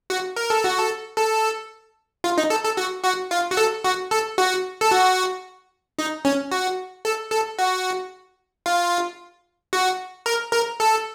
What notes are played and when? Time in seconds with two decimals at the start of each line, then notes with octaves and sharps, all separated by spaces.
0.10 F#4
0.36 A#4
0.50 A4
0.64 F#4
0.78 A4
1.17 A4
2.24 F4
2.38 D#4
2.50 A4
2.64 A4
2.77 F#4
3.04 F#4
3.31 F4
3.51 F#4
3.57 A4
3.84 F#4
4.11 A4
4.38 F#4
4.81 A4
4.91 F#4
5.98 D#4
6.25 C#4
6.52 F#4
7.05 A4
7.32 A4
7.59 F#4
8.66 F4
9.73 F#4
10.26 A#4
10.53 A#4
10.80 A4